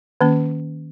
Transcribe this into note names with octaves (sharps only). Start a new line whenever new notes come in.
D#3 A#3 C#4